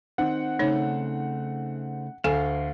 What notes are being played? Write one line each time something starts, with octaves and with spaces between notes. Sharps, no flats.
D#3 C4 F#5
C#3 A3 D#4 C#5
D2 A4 F5 G#5